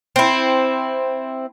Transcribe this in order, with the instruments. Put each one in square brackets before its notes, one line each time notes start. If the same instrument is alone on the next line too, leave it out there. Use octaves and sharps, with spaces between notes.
[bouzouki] C4 E4